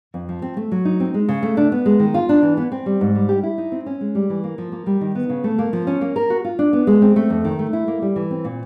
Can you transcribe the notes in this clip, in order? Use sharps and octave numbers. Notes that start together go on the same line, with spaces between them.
F2
F3
C4
A3
F#3
D#4
C4
G#3
C#3
A3
D4
B3
G#3
D#3
F4
D4
E3
B3
C4
G3
G#2
G3
G4
E4
D#4
C4
C#4
G#3
G3
E3
A#3
F3
A#3
G3
D#3
B3
C#3
A3
A#3
F3
C#4
A#3
A#4
F#4
F4
D4
B3
G#3
C4
A3
F2
D#3
A3
E4
A#3
G3
E3
C4
A#2